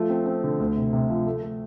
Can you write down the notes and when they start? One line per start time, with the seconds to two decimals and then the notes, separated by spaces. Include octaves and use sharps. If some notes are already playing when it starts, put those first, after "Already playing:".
Already playing: F3 A3
0.10 C4
0.26 C4
0.44 D3
0.60 D2
0.76 C3
0.93 C3
1.10 F3
1.26 A3
1.43 A3